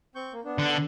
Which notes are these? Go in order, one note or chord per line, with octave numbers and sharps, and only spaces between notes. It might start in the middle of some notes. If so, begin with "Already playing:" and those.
C4 C#6 G6
A#3
B3 D4
D3